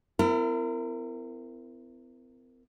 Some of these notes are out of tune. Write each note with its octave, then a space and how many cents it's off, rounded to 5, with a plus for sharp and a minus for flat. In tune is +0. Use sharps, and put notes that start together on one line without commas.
C4 -45 E4 +25 A#4 -25